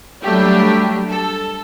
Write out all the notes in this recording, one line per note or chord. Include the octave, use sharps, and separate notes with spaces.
F#3 G3 A3 D4 G4
A4